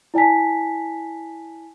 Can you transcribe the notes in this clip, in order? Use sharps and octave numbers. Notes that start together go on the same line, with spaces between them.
E4 D5 G#5 A5 B6